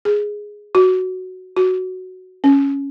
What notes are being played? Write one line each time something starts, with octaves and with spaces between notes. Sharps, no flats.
G#4
F#4
F#4
C#4